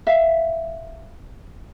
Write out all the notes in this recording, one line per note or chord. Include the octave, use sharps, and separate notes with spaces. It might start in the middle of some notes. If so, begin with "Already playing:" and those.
E5 F5